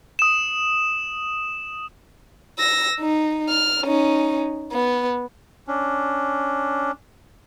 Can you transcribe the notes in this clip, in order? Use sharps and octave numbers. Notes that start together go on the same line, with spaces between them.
D#6 E7
E6 A#6
D#4
F6
C#4 D#4
B3
C#4 D4